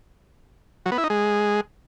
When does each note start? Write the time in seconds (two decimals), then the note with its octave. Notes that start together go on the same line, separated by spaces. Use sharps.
0.86 F#3
0.92 B3
0.98 E4
1.04 D#4
1.10 G#3